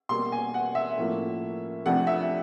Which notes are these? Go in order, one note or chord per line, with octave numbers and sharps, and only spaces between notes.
B2 G3 A#3 C6
G#5
F#5
E5
A2 F3 A#3 C#4
F2 C3 F3 A3 D4 F#5
E5